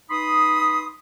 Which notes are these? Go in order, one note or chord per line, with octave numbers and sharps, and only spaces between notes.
D#4 B4 B5 C6 D#6